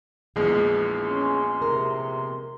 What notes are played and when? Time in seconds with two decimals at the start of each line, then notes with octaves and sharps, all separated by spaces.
0.36 A#1 E2 G#3 G#4
1.04 C#4 C6
1.62 C3 A#4